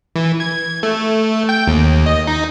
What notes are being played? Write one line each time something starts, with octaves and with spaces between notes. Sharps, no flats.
E3
G#6
A3
G5
D#2
D#5
D#4